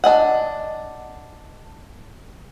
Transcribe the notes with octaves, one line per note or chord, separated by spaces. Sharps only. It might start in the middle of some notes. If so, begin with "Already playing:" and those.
D4 D#5 F#5